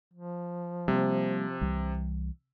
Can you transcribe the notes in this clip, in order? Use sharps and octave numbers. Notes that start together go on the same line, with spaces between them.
F3
C3 G3 G#3 A#3
C2 E3 G3